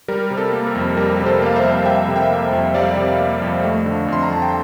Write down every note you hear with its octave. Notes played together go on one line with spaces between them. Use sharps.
G3 A#4
C3
A4
A#3
A#4
F2
G3 A#4
C3
A4 C5
A#3 F5
C5 E5
F2
G3 E5 G5
C3
E5 G5
A#3
F2
G3 D5 F5
C3
A#3
F2
A3
D3
F2 C6
A#5
F2 A5
G5